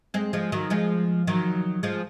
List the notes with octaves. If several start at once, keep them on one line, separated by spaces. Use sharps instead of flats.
G#3 C4
F3 G#3
D#3 F#3
F3 G#3
D#3 F#3
F3 G#3